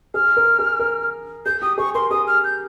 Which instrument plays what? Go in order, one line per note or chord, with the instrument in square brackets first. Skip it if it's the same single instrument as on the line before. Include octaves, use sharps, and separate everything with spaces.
[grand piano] G#4 [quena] F6
[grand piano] A#4
G#4
A#4
[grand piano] G#4 [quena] G6
[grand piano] G4 [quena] D#6
[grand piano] G#4 [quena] C#6
[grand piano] A#4 [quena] C6
[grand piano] G#4 [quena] D#6
[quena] F6
G6